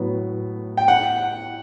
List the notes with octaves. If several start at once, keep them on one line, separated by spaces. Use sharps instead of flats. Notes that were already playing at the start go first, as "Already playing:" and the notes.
Already playing: A2 F#3 B3
G5
F#5